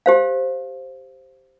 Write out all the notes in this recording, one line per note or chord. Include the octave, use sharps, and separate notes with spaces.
G4 C5 F5